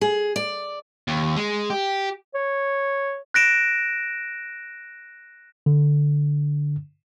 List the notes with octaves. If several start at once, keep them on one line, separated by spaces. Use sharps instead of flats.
G#4
D5
D#2
G#3
G4
C#5
F#6 A#6 D7 E7
D3